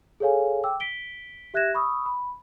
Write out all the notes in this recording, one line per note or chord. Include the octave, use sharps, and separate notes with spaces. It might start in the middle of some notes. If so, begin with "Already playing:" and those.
G#4 A4 C#5 F5 G#5
G5 D6 E6
B6 D7 G7
G4 E5 F#6 G#6 A#6 E7
B5 C#6 D#6 E6
B5